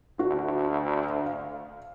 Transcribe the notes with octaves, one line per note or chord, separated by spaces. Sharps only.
D2 F#4
F5